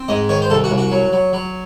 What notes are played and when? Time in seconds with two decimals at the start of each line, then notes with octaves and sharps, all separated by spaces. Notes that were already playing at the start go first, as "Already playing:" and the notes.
Already playing: C4
0.08 G#2 D#5
0.29 D#3 C#5
0.42 C5
0.50 C2 A4
0.64 F#4
0.71 C2
0.78 F#4
0.92 F#3
1.13 F#3
1.33 F#3